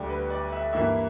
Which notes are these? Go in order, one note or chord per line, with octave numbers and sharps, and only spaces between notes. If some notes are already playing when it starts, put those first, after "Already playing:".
Already playing: D2 D3 G3 G5
B4
D5
E5
G2 E3 A#3 E5